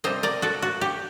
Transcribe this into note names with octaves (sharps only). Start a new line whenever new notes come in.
C3 G3 C4 C5 D#5
A#4 D5
F#4 A4
F#4
G4